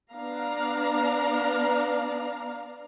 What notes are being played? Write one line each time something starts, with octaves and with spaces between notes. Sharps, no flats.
B3 D4 F5 A#5